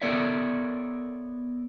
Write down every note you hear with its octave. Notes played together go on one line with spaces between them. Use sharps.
B3 A4 A#4 C#5 D5 E5